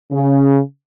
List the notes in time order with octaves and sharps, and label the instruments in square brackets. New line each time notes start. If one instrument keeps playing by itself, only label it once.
[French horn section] C#3